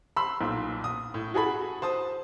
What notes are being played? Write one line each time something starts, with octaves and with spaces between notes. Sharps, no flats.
B5 C6 E6
B1 A#2
D#6
A2
F#4 G#4 A4 B5
C5 A5 D#6